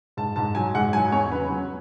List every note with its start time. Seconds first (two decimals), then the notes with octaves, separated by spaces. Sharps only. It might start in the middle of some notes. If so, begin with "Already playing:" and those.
0.17 G#2 A5
0.36 G#2 A5
0.55 F#3 G#5
0.75 G#2 F#5
0.93 F#3 G#5
1.12 E2 C#5
1.32 C#3 B4
1.50 F#3